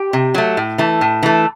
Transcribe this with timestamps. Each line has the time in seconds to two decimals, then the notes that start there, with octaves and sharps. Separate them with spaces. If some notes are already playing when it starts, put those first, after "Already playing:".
Already playing: G4 G5
0.13 C3
0.34 F#3 A3
0.57 A2
0.78 E3 A3
1.01 A2
1.23 E3 A3